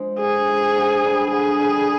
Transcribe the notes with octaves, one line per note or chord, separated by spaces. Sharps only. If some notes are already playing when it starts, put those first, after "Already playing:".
Already playing: F3 G#3 D4
D3 G#4
F3 G#3
D3
G3 D4
D3 G#4
G3 D4